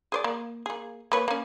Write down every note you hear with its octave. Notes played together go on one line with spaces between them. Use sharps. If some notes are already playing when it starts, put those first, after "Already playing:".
G#4 C5 D5
A#3
A#3 G#4
A#3 B4 C#5
A#3 C#4